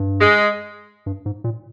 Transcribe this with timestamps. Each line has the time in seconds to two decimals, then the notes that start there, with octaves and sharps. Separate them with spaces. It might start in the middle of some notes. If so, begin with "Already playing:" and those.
Already playing: G2
0.21 G#3
1.06 G2
1.26 G#2
1.44 A#2